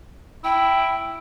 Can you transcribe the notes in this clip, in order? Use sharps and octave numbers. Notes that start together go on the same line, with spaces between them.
E4 G5